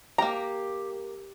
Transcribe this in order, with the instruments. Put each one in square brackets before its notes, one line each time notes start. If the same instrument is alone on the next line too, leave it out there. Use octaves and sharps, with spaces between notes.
[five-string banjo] A#3 A#5 [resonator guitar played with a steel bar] G4